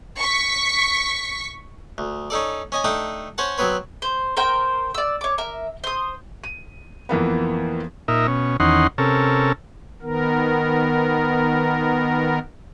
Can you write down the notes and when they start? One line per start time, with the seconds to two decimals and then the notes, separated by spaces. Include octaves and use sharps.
0.20 C#6 B6
1.98 D2
2.30 C#4 D#4 A4 D5
2.72 C#4 D#5 G#5
2.84 A3 D4 D#4 G5 A5 D#6
3.38 C#4 C5 C#5 F#5 A5
3.58 F#3 B3 C4 B4 C#5
4.02 C5
4.37 A#4 C5 G5
4.94 D5 E6
5.21 C#5 D6
5.38 A#4 E5
5.84 C5 D#6
6.44 D#7
7.09 F2 E3 A#3 B3
8.08 A#2 D#4 A#4 E5
8.28 B2 C#4
8.60 E2 D#3 C#4 D#4 F#5 C6
8.98 C3 C#4 A4 A#4
10.02 D#3 B3 A#4